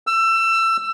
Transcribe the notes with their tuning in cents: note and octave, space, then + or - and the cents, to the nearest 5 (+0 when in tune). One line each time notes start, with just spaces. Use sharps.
E6 +25